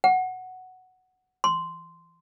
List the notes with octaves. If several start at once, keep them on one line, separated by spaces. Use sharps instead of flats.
F#5
C6